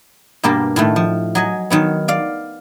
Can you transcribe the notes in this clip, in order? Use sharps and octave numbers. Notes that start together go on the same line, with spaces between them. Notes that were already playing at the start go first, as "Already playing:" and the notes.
G2 B2 A#3 G4 A#4 A5
A2 D#3 A3
F3
F#3 D#5 G#5
D#3 F#3 B3
D5 F5